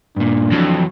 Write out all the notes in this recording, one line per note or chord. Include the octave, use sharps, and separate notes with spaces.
G2 A#2 D4
F2 E3 F#3